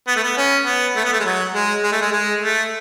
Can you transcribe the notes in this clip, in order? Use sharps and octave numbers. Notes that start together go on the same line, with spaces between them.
B3
A3
B3
C#4
B3
A3
B3
A3
G#3
F#3
G#3
G#3
A3
G#3
G#3
A3